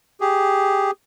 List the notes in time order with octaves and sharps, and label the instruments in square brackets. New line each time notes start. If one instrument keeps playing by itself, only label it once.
[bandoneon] G4 G#4